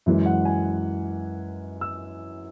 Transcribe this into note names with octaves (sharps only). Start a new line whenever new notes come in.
F#2 E3 G#3
F#5
G#5
E6